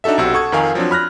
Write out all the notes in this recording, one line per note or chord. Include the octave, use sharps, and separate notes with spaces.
D4 D#4 F#4 A4 E5
B1 C3 F#4 E6
A4 F#5 C#6 D#6 G#6
F2 D#3 A#4 F5 G#5
F3 F#3 C4 D4
B5 F6 F#6 A#6